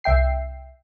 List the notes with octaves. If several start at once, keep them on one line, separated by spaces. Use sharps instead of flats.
C2 E5 G5 C7